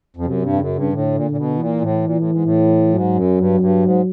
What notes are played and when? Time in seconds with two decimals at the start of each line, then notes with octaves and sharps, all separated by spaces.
0.16 F2
0.25 F#2 C3
0.42 G2
0.53 F2
0.59 F#2 C#3
0.76 G2
0.93 A2 D3
1.15 A#2
1.31 A#2
1.37 B2
1.59 A#2 E3
1.82 A2
2.04 A#2
2.17 A2
2.30 G#2
2.44 A2
2.94 G#2 F#3
3.15 F#2
3.38 G2
3.54 F#2
3.60 G2
3.83 G#2